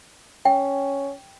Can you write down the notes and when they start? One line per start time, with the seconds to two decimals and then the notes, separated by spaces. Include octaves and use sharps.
0.45 C#4 G5